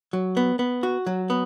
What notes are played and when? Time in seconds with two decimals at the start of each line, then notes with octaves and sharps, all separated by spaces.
0.13 F#3
0.37 B3
0.59 B3
0.83 F#4
1.07 F#3
1.30 B3